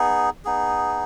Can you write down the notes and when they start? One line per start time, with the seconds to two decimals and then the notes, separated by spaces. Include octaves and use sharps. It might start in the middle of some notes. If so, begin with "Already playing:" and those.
Already playing: B3 D#4 G#4
0.45 B3 D#4 G#4